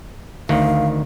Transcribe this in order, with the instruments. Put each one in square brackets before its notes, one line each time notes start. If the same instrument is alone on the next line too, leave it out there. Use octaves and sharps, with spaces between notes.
[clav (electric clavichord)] D2 D#3 [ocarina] F5